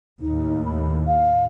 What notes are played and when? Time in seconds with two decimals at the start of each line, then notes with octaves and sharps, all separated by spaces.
0.21 D#2 A2 D#4
0.65 B5
1.06 F5